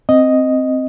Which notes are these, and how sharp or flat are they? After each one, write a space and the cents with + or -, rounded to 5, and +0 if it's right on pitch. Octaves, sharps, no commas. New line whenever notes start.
C4 +0 D#5 +0